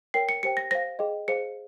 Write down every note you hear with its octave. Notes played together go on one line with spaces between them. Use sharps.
A#4 C#5 G5 C7
C#7
G4 C5 G5 C#7
A#6
C5 F5 A#6
G#4 D#5 G5
G#4 C5 F5 C#7